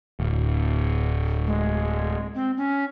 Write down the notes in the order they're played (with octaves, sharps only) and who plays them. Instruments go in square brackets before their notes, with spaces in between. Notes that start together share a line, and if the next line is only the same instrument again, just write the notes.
[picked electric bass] D1
[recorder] G#3
C4
C#4